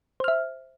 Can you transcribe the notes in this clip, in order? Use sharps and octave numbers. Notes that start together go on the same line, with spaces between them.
C5 E5 F6